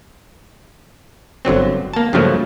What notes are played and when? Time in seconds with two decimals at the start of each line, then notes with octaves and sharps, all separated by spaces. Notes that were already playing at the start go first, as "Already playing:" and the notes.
1.45 G1 D3 F#3 C4
1.93 A#3 A5
2.13 G2 C#3 F3 F#3 A3 A#3